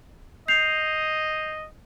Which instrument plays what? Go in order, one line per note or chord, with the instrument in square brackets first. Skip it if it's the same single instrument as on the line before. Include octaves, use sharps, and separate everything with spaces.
[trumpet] D#5 [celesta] G6 C7 F7